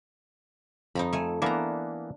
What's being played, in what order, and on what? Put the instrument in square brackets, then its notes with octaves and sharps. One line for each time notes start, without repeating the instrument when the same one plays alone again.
[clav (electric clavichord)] F2 [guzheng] D#4 A#5 B5
[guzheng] A3 G#5
[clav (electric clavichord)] E3 A#3 B3 [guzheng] D4 A#5